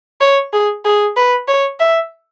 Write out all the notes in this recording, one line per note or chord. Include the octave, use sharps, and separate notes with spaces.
C#5
G#4
G#4
B4
C#5
E5